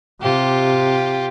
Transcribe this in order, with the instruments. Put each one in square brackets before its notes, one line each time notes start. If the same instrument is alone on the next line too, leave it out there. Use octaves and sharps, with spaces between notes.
[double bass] C3 [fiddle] F4 G4